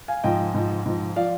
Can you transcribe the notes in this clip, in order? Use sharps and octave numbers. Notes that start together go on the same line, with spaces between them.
F5 G#5
G#2 F3 D#5 G5
G#2 F3
G#2 F3
F3 D5 F5